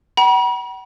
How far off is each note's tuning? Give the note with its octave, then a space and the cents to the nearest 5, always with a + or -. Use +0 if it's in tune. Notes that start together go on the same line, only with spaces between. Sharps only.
F#5 +45 B5 -45